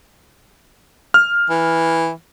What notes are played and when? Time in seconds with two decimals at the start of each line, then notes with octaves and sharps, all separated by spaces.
1.14 F6
1.50 E3